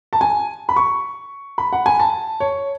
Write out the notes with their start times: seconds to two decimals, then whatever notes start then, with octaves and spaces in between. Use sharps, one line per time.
0.13 A5
0.21 G#5
0.69 B5
0.76 C#6
1.58 B5
1.73 F#5
1.86 G#5
2.00 A5
2.40 C#5